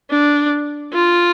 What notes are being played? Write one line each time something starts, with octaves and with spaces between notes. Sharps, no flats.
D4
F4